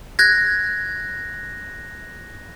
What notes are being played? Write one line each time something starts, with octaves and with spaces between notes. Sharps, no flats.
F#6 G#6 A#6